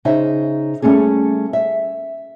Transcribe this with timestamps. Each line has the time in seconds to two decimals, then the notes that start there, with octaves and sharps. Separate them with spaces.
0.05 C#3 D#4 C5 E5
0.82 G3 A3 C#4 D4 G#4
1.53 E5